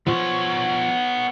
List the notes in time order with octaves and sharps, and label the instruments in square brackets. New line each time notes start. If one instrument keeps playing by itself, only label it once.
[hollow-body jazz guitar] F3 [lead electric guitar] B3 C#5